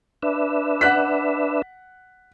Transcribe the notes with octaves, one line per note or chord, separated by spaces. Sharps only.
D4 B4 E5
F#5 F#6 B6